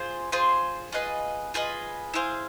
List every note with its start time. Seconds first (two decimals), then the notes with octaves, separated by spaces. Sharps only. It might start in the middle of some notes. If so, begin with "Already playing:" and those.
Already playing: F4 G#4 C5
0.32 F4 G#4 C5
0.92 F4 G#4 B4 D#5
1.54 F4 G#4 B4 D#5
2.14 E4 G#4 C5 F5